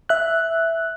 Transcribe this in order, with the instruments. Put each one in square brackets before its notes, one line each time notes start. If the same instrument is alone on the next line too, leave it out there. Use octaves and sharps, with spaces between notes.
[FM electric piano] E5 F#6